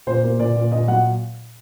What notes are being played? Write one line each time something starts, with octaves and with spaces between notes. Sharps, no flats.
A#2 C5
A#3
A#2 D5
A#2
A#2 D#5
F#3 F#5